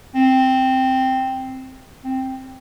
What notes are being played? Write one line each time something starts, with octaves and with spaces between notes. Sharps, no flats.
C4
C4